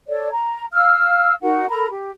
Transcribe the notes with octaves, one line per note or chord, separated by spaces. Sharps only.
A4 C#5 D5
A#5
F5 E6 F6
D#4 F#4 A#4 F#5
A4 A#4 A#5 B5
G4